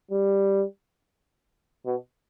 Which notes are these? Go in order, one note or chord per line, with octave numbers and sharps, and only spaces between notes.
G3
B2